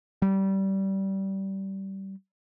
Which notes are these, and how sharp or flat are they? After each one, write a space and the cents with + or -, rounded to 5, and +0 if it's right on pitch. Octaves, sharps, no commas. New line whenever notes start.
G3 -20